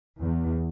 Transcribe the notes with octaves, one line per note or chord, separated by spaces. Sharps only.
E2